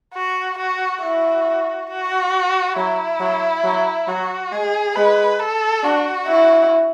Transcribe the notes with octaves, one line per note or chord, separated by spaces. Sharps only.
F#4
F#4
E4 F#4
F#4
F#3 E4
F#3
F#3
F#3 F#4
G#3 G#4
G#3 B4
A4
D4 F#4
E4